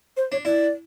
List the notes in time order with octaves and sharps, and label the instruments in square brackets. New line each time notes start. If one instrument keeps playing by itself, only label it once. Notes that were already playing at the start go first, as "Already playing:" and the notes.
[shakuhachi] C5
[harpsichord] D4 [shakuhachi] C#5
[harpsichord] E4 [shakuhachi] D5